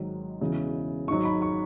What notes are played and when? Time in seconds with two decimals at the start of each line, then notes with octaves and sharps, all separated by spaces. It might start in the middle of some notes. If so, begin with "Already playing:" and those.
Already playing: G#1 G#2 D#3 F#3
0.41 E1 E2 C#3 E3
1.08 G#1 G#2 F#3 C#6
1.25 B5
1.42 C#6